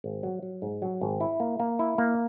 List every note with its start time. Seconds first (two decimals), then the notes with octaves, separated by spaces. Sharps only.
0.04 G#1
0.23 F#3
0.43 F#3
0.62 G#2
0.82 F#3
1.01 G#1
1.21 E4
1.40 A#3
1.60 A#3
1.79 E4
1.98 A#3